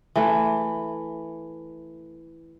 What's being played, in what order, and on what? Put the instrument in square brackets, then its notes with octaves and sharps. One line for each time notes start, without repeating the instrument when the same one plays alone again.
[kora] E3 A3